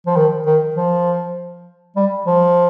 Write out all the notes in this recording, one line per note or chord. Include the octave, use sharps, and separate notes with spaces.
F3
D#3
D#3
F3
G3
F3